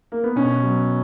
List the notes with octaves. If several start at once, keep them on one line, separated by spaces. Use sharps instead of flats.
A#3
B3
B2 C#4
F#3